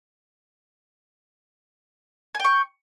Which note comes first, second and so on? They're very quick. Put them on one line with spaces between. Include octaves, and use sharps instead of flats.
G#5 G5 C#6